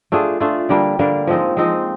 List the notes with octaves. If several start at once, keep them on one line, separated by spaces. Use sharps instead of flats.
A3 D4 F4 G#4
A3 D4 F4 G#4
D3 G3 A#3 D4
D3 G3 A#3 D4
F3 G#3 C4 D#4
F3 G#3 C4 D#4